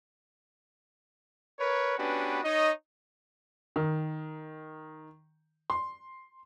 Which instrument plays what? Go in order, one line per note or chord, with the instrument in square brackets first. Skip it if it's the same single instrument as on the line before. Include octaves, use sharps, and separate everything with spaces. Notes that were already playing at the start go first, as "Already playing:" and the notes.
[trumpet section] A#4 B4 C#5
B3 C#4 D4 F#4 G4 B4
D#4 C#5 D#5
[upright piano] D#3
C6